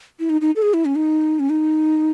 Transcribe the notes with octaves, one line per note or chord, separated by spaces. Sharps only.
E4
D#4
D#4
A4
G#4
E4
C#4
D#4
C#4
D#4